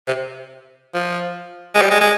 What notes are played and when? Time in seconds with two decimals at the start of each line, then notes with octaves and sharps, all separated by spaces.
0.07 C3
0.94 F3
1.74 G#3
1.82 G3
1.91 G#3
2.01 G#3